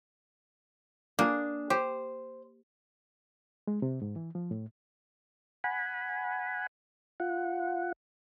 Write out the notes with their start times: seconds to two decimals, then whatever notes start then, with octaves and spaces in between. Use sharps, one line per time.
1.19 A#3 D4 G#4
1.70 G4 C5
3.67 G#3
3.82 C3
4.02 G#2
4.16 E3
4.35 F3
4.51 A2
5.64 F#5 G#5 B5
7.20 F4 F#5